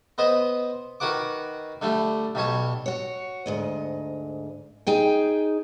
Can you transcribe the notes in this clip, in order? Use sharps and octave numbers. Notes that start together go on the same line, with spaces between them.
B3 B4 C5 D#5
D#3 F#4 B4 F#5 D6
D3 G3 A3
B1 G3 C#5 A5
F#4 C#5
D2 G#2 D#5
D#4 G#4 G5